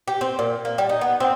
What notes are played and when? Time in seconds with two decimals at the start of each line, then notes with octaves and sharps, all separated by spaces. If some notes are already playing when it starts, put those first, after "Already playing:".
0.08 G4
0.21 C4
0.39 A#2
0.65 A#3
0.78 G3
0.89 D#4
1.01 B3
1.20 C4